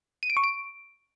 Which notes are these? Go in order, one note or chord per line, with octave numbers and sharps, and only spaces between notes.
D#7
D7
C#6
D7